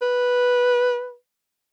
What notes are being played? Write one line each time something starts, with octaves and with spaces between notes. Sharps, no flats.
B4